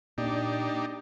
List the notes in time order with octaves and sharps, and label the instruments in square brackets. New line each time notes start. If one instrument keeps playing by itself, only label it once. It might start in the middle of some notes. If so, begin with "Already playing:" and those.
[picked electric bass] A#2 [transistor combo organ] D4 D#4 G4